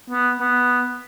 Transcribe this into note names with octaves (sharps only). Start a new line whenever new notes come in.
B3
B3